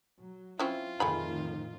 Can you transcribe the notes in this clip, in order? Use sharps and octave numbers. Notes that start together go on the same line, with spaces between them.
F#3
C4 C#4 E4 F4
F2 A2 D#3 A3 G#4 B5